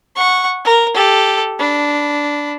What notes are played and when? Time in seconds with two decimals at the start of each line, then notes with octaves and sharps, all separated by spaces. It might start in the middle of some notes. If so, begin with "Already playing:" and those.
0.16 F#5 C#6
0.65 A#4
0.94 G4 A4
1.59 D4 B5